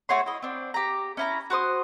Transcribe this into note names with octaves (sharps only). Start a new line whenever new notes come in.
A3 F#4 C#5 C6
E4 D#5
C4 D4
G4 A#5
C#4 E4 A#5
F#4 C5 C6 D#6